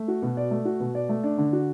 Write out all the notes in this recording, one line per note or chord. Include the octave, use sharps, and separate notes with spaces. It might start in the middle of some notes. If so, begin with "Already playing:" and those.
Already playing: A3
F#4
B2
D5
A3
F#4
B2
D5
A3
D4
D3
F#4